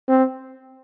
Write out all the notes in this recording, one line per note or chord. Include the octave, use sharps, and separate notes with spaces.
C4